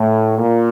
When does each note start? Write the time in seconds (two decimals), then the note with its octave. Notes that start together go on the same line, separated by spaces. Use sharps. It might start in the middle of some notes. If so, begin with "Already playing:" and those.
Already playing: A2
0.38 A#2